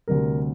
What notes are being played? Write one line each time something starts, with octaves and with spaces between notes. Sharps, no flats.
D2 C3 G3 A#4